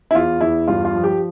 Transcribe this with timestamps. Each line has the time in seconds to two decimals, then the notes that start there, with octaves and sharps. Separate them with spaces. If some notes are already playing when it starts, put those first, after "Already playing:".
0.11 E4
0.15 E2 F4
0.40 E2 E4
0.68 G2 F4
0.85 F4
0.95 F3
1.04 G4